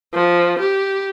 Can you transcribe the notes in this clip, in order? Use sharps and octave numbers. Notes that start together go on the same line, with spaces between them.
F3
G4